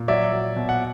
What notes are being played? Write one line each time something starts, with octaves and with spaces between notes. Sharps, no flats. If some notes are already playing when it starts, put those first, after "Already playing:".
Already playing: A#2
F#3 D5 E5
F#3
B2
F#5